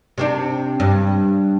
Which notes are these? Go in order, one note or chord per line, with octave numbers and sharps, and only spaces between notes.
C3 C4 D4
G2